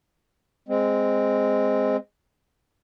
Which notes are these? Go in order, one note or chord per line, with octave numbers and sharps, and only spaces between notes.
G#3 C4